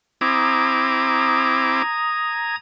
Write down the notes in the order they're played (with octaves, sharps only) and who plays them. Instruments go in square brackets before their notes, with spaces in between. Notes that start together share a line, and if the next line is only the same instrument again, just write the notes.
[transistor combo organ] C4 E4 D6 [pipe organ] A#5 D#6 G#6